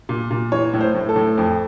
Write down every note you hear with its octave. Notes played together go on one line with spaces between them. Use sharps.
A#2
A#2
E3 C#5
A2
C5
A2
A4
A2
F2